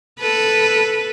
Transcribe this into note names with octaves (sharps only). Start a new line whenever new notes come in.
A4 B4